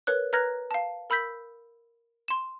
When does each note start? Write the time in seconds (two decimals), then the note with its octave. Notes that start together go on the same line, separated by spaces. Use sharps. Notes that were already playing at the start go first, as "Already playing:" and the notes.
0.07 A#4 B4 C#5 F#6
0.33 B4 A#5 F6 F#6 G#6 A#6
0.71 F5 A5
1.10 A#4 B5 E6 G6 B6
2.28 C6 E7